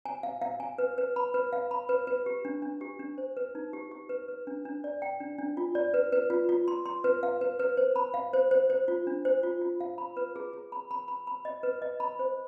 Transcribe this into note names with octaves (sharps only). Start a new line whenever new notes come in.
G#5
F5
F5
G#5
B4
B4
B5
B4
F5
B5
B4
B4
G4
D4
D4
G4
D4
C5
B4
D#4
G4
G4
B4
B4
D4
D4
D5
G5
D4
D4
F4
D5
B4
B4
F4
F4
C6
C6
B4
F5
B4
B4
C5
B5
F5
C5
C5
C5
F4
D4
C5
F4
F4
F5
B5
B4
G#4
G#4
B5
B5
B5
B5
D#5
B4
D#5
B5
C5